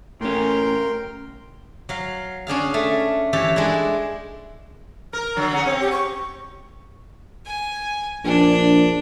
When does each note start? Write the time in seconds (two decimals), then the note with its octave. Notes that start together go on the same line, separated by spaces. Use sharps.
0.21 A2 C#4 A#4 G5 C6
1.89 F#3 F5
2.47 C#4 D4 G#4 F5
2.74 A3
3.33 E3 G4 A4 C#5 A5
3.56 G#3 D4 E4
5.13 A#4 F6
5.36 D3 F#3
5.53 C#4 G#4 F#5
5.66 C4 C#5
5.81 G4
5.92 C#6
7.46 G#5
8.24 A#1 D4